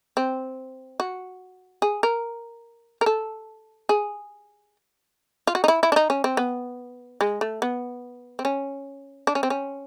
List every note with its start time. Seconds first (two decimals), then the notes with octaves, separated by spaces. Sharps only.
0.17 C4
1.00 F#4
1.82 G#4
2.03 A#4
3.01 A#4
3.06 A4
3.89 G#4
5.47 F4
5.55 F#4
5.64 D#4
5.68 E4
5.83 E4
5.92 D4
5.96 D#4
6.10 C#4
6.24 C4
6.37 B3
7.21 G#3
7.41 A3
7.62 B3
8.39 C4
8.45 C#4
9.27 D4
9.35 C#4
9.43 C4
9.50 C#4